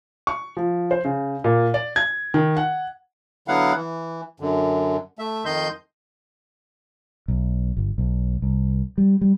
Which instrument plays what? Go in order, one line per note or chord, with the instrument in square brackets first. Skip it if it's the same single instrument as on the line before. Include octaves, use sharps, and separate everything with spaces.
[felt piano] C#6
F3
C5
C#3
A#2
D5
G#6
D#3
F#5
[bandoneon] D3 F#3 B3 E4 F5 F#5
E3
F#2 D3
A3 E5
F2 D#3 D#5 C6 G6
[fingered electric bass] B1
G1
B1
C2
G3
G3